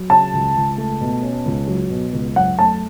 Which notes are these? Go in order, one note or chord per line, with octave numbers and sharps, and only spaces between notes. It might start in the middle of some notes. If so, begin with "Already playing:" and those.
Already playing: F#3
C#3 A5
C#2
C#2
A3
B2
C#4
C#2
F#3
B2
C#2
F#2 F#5
A3 A5